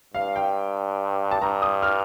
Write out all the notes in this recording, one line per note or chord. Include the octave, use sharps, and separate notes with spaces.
G2 F5
G5
A5
G2 A#5
D#6
F6